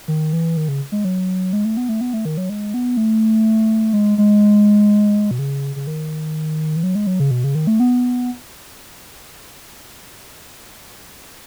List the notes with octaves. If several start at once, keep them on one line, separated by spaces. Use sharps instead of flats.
D#3
E3
D#3
C#3
G#3
F#3
G#3
A3
B3
A3
B3
A3
D#3
F#3
G#3
B3
A3
G#3
G#3
B2
C#3
C#3
D#3
E3
F#3
G#3
F#3
C#3
B2
C#3
D#3
A3
B3